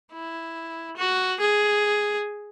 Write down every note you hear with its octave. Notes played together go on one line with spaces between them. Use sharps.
E4
F#4
G#4